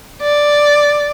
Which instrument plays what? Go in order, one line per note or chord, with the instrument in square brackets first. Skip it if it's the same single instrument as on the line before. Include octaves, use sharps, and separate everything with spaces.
[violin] D5